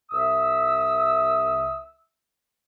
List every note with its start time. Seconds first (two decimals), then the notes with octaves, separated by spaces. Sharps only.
0.11 C2 E5 D#6 E6